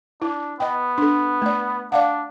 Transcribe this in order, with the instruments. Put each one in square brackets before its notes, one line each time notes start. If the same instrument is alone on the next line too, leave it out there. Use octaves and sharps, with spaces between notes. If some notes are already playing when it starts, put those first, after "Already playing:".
[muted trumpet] D4 [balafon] E4
[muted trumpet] B3 [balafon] D#5 G5
[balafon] D4 A4
A3 D5
[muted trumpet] D4 [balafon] D5 F5 F#5